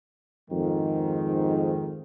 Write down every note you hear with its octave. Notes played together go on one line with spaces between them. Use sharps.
F2 G#2 D#3